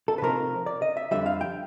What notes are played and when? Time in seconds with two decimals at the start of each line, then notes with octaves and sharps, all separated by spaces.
0.08 A4
0.18 B4
0.22 C3 F3 A3 C4 D#4 A#4
0.66 D5
0.82 D#5
0.97 E5
1.11 F2 D3 G3 E5
1.26 F5
1.41 G5